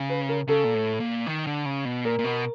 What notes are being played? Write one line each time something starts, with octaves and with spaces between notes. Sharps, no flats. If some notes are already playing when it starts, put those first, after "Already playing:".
Already playing: C#3
B4
A#4
C#3 A4
A#2
A2
A#2
D#3
D3
C#3
B2
A#2 A#4
A#2
B2